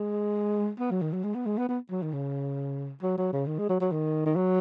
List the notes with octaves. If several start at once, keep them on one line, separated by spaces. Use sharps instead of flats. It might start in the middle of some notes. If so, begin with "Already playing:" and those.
Already playing: G#3
B3
F#3
D#3
F#3
G#3
B3
G#3
B3
B3
F#3
D#3
C#3
F#3
F#3
C#3
D#3
G#3
F#3
F#3
D#3
D#3
F#3